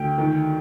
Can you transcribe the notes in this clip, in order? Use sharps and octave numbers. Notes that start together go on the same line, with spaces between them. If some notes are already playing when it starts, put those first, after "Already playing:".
Already playing: D2 G5
D#3